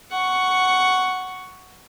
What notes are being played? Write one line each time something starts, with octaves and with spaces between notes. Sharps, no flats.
F#5 C#6